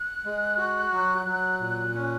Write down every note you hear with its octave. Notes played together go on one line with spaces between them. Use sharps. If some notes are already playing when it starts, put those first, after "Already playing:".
Already playing: F#6
G#3
F#4
F#3
F#3
A#2
C#4